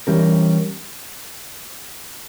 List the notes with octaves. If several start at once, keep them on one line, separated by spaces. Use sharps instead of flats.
E3 G3 C#4 G4 A#4